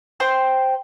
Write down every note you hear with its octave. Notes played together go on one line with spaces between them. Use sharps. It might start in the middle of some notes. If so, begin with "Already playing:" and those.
C5 G5 C6